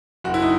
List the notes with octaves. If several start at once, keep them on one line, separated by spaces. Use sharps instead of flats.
F#1 F#4
E4
D#4